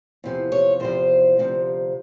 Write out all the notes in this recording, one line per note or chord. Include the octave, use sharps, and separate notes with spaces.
E2 C3 F3
C#5
E2 C3 F3 C5
D2 C3 F3